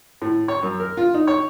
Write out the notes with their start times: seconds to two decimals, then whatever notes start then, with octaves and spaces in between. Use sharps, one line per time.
0.22 A2
0.48 C#5
0.63 F#2
0.80 A#4
0.97 F4
1.14 D#4
1.27 C#5